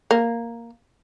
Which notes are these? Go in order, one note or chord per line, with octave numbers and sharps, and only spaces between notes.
A#3